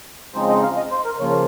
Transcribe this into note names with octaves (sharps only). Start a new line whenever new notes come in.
C#3 F3 G#3 C4 D#4 C5
D#5
F5
D#5
C5
A#4
C#3 F3 A#3 F4 C#5
A#4